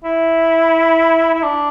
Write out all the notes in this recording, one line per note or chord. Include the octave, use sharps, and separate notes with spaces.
E4
E4
D4